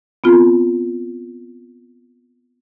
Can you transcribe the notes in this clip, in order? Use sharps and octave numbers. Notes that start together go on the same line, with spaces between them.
B3 C4 F4